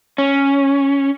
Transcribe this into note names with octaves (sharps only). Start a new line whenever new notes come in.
C#4